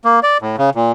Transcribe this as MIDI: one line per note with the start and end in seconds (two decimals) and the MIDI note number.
0.05 0.20 58
0.23 0.38 74
0.42 0.56 45
0.58 0.70 49
0.75 0.92 46